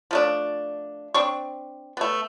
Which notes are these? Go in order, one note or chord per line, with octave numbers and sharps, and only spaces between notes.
F3 A3 D4
C4 D4 C#6
A3 B3